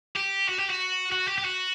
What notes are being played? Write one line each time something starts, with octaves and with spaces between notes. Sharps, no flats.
G4
F#4
G4
F#4
F#4
G4
G4
F#4